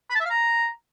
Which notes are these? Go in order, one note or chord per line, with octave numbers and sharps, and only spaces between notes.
B5
A5
E5
F5
A#5